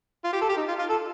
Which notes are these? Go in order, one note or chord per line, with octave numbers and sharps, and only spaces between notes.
F4
G4
A4
G4
D#4
F4
F4
A4